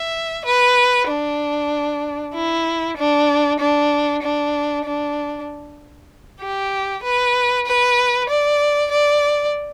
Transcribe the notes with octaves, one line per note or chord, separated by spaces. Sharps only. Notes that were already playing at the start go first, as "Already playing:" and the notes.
Already playing: E5
B4
D4
E4
D4
D4
D4
D4
G4
B4
B4
D5
D5